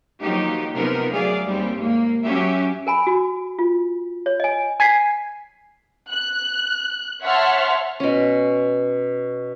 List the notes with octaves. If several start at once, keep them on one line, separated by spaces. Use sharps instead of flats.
D#3 F3 F#3 A#3 D#4 G4
C3 F3 B3 D#4 A#4
D2 F#3 A3 G#4 D5 F5
D#2 G3 C4
D#2 G#2 A#3
F#3 C#4 G4 E5
A#4 G#5 B5
F#4
F4
C#5
D#5 G#5
G#5 G#6 B6 C7
F#6
C#5 E5 F#5 A5 C6 F6
B2 C#4